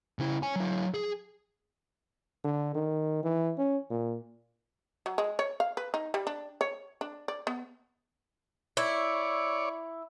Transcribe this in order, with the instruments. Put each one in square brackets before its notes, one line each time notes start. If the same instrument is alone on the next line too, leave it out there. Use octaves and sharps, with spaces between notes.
[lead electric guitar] C#3 E4
C#5 G#5
F#3 E4
G#4
[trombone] D3
D#3
E3
C#4
A#2
[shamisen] F#3
G#3
C#5
F5
B4
D#4
G3
D4
C#5
D4
D5
B3
[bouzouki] E4 [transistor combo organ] C#5 D5